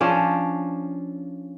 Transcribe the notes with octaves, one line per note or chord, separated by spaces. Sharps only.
F3 C#4 D4